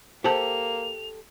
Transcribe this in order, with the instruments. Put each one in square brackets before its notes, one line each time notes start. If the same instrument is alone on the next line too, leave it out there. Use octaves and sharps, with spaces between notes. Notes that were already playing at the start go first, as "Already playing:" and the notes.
[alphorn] A#3 [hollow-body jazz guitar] G4 A4 [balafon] C5 A5 [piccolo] F7